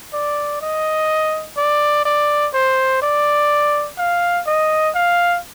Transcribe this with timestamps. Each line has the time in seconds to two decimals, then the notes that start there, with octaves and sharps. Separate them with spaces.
0.13 D5
0.61 D#5
1.58 D5
2.05 D5
2.54 C5
3.02 D5
3.98 F5
4.47 D#5
4.95 F5